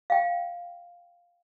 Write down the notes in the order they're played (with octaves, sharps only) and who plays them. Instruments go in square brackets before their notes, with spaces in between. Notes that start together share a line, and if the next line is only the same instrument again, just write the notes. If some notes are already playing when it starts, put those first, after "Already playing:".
[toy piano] F5 G5